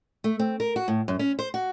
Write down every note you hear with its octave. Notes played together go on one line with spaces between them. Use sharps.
A3
C4
A#4
F#4
A2
F#2
C#4
C5
F#4